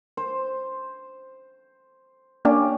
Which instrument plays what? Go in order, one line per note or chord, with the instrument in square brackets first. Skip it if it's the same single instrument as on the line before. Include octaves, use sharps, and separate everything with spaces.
[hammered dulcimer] C5
[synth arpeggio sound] A#3 D4 [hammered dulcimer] C#4 G4